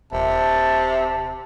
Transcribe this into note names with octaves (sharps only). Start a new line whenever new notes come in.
D#1 C3 A5